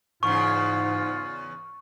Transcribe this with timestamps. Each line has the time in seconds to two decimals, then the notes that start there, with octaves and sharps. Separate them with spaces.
0.23 E2 G#2 C#3 F4 C#6